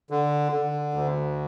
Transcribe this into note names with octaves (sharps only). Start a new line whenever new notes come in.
D3
D3
D2